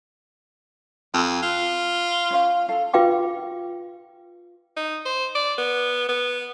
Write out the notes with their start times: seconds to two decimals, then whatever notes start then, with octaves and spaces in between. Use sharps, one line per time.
1.14 F2 B5
1.43 F4
2.31 C#4 C5 F5
2.69 A4 F5 A5
2.93 F4 B4 F5 G5 D6
4.76 D#4
5.05 C5
5.35 D5
5.58 B3
6.08 B3